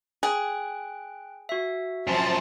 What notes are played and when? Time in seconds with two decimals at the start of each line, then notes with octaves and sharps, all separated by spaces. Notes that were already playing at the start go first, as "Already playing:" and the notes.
0.23 G#4 G5 F#6
1.49 F#4 E5
2.07 F#2 F3 C5 G#5 A5